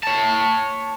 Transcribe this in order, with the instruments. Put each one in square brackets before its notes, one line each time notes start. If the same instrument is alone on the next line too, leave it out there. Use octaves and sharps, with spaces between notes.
[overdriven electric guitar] C#5 A5